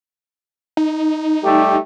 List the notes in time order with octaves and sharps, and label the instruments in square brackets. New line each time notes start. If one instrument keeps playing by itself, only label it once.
[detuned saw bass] D#4
[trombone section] G3 A3 G4